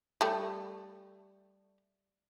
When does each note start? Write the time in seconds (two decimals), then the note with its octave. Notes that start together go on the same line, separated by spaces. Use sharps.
0.21 G3 A3